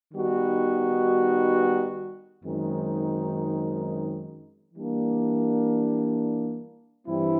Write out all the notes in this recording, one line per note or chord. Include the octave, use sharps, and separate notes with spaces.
D#3 G3 B3 D#4 F#4
F#2 D#3 G#3 C4 D#4
E3 G3 A#3 D4
G2 E3 G3 C4 E4